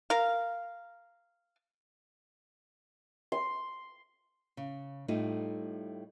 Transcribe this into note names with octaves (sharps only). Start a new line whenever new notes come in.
A#4 F5
C6
C#3
A2 G3 A3 D#4 F4